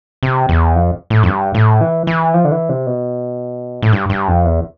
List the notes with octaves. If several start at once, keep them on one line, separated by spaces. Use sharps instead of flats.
C3
E2
F2
A2
F2
G2
A2
E3
E3
F3
D3
E3
C3
B2
A2
G2
G2
F2
E2